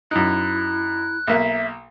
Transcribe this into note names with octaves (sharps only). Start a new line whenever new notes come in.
F#2 D#4 E4 F#6
B1 A#3 E5